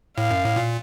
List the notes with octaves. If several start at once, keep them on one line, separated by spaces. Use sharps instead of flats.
A2 F5
F#2
A2
A#2